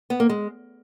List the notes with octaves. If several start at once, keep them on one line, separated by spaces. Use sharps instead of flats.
B3
A#3
G#3